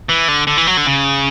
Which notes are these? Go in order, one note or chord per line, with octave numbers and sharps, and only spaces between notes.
E3
D3
D3
E3
F#3
D3
C#3